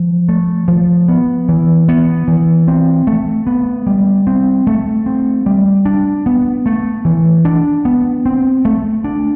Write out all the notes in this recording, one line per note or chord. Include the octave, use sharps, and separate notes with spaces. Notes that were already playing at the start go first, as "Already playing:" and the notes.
Already playing: F3
A3
F3
B3
E3
B3
E3
C4
A3
B3
G3
C4
A3
C4
G3
D4
B3
A3
E3
D4
B3
C4
A3
D4